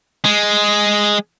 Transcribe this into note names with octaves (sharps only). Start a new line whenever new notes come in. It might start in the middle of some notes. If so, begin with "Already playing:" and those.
G#3